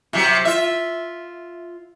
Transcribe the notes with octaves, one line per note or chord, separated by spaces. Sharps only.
C3 F#3
F4 E5